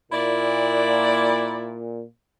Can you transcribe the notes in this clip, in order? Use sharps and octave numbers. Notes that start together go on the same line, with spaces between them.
A#2 E4 D5